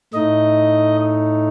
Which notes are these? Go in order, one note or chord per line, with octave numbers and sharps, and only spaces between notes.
A2 A3 D#4 D#5